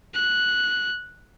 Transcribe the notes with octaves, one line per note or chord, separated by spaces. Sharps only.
F#6